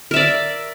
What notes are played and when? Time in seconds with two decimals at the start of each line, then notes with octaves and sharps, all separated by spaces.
0.11 A#4
0.14 E5
0.16 D5